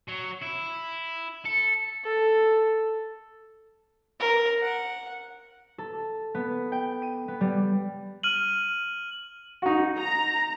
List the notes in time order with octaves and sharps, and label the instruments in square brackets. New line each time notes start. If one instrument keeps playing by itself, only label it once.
[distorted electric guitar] F#3
E4
A4
[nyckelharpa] A4
[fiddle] A#4
F#5
[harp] A4
B3
G5
D#7
B3
G3
[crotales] F6 D#7 F#7
[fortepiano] D#4 F#4
[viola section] A#5